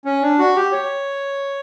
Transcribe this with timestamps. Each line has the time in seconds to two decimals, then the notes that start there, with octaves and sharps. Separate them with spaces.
0.05 C#4
0.22 D4
0.39 F#4
0.56 G4
0.72 C#5